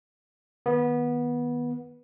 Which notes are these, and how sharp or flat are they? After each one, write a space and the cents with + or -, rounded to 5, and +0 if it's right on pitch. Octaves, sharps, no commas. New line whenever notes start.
D#3 -5 B3 -20